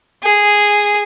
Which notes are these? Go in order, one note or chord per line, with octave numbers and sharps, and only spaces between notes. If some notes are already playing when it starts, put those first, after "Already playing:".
G#4